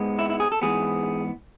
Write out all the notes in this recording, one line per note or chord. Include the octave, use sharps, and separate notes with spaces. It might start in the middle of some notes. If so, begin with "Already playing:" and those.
Already playing: G#2 G#3 B3
E4
E4
G#4
A4
G#2 E3 B3 G#4